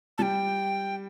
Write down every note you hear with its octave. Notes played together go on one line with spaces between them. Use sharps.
G3 G5 A5